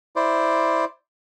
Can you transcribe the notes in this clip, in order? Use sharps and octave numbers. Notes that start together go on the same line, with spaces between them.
E4 C5 D5